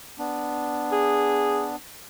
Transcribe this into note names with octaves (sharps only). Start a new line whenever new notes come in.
B3 D4
G#4